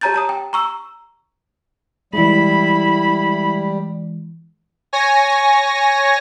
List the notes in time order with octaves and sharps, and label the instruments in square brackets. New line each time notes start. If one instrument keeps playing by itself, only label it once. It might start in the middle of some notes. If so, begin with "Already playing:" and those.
[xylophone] G4 C#5 A5 A#5 G6 A6
A5 A#5 D#6
G5
A#5 C#6 E6
[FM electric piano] E3 G#3 [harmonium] G3 [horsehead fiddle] E4 B5
[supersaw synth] C#5 G#5 A#6